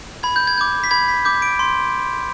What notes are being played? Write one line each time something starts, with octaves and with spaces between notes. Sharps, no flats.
B5 G#6
G6
G#6
D6 G6
B6
B5 G#6
B6
D6 G6
D7
C6